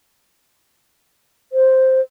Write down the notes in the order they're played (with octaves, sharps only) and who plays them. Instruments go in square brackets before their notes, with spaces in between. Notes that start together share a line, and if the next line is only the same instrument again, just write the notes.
[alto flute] C5